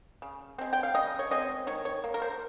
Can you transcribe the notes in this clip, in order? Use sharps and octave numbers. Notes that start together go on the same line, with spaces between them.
C#3
G#3 C4
G5
F5
C#3 D#5
C#5
G#3 C4 D#5
D#3 C#5
C#5
A#3
A#4
C5